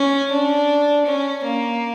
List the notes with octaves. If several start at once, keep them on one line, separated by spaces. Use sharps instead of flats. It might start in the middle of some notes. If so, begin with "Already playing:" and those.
Already playing: C#4
D4
C#4
A#3